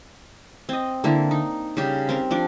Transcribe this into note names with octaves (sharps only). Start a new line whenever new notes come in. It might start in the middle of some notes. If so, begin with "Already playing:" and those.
C4 D#5
D3 A#3 E4
D#4
C#3 G3 G4
C4 A#4
F3 D4 D6